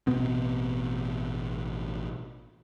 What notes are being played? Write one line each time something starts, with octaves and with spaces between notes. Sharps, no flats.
A1 B2 B3 C4